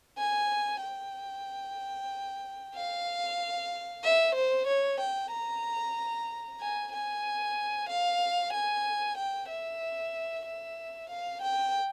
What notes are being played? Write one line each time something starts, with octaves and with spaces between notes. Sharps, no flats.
G#5
G5
F5
E5
C5
C#5
G5
A#5
G#5
G#5
F5
G#5
G5
E5
E5
F5
G5